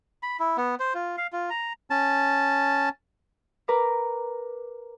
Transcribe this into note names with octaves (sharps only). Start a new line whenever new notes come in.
B5
E4
B3
C5
F4
F5
F4
A#5
C#4 A5
A#4 B4 A#5 B5 D6